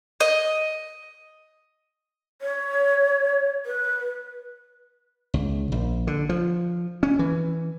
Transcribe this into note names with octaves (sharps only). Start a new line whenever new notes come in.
D#5
C#5
B4
C#2
A#1
D3
F3
C#4
E3